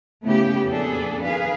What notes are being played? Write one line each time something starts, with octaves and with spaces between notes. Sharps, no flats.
C#3 A3 B3 E4 G4
F2 A#2 B3 D4 G#4 A4
D#3 G#4 B4 F5